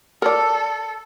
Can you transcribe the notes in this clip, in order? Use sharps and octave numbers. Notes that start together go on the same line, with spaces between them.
A4 A#4 D5